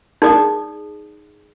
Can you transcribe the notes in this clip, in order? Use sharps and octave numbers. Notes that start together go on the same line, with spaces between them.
D#4 G#4 D5 D#6